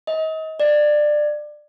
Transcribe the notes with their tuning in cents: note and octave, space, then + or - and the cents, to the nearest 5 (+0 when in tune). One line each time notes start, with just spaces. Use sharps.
D#5 +35
D5 +20